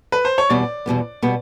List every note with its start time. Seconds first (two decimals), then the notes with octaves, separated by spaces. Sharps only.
0.12 B4
0.25 C5
0.38 C#5
0.49 E2 B2 G3 B3 D5
0.86 E2 B2 G3 B3
1.22 B2 G3 B3